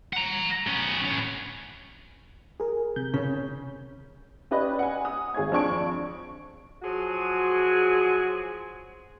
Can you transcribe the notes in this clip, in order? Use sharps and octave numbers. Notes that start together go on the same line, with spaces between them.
F#5 A#5
B3 C#4
A2 C#4
G#4 A#4
C3 G6
C#3 C#4
C#4 G4 B4 D5 D#5
F#5 G#5
D#6
G#1 G#4 C#5 G#6
F2 D4 C#6 D7
F3 F#3 F#4 G#4